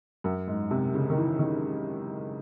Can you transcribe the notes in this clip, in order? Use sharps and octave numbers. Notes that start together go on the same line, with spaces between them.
F#2
G#2
C3
C#3
D#3
E3
D#3